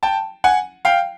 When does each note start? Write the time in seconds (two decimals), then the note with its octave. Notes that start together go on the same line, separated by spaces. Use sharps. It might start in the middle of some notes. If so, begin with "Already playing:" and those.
0.03 G5 A5
0.44 F#5 G#5
0.85 F5 G5